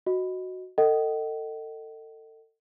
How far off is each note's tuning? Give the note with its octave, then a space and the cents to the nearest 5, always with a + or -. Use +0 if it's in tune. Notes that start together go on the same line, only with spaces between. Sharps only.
F#4 +0 D#5 +0
A4 +35 D#5 +0 F#5 +45